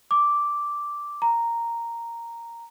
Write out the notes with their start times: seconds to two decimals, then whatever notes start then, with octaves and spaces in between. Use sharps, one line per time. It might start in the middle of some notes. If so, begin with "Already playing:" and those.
0.11 D6
1.22 A#5